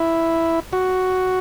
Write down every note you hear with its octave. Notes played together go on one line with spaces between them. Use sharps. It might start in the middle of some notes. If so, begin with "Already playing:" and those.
Already playing: E4
F#4